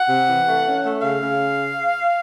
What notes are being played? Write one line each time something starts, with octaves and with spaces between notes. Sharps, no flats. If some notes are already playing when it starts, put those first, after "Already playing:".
Already playing: F#5
C3
E3
A3
C#4
A3
C#3 F5
C#3